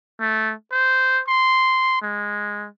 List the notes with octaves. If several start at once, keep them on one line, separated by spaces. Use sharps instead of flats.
A3
C5
C6
G#3